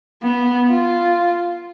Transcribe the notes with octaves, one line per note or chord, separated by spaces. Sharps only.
B3
F4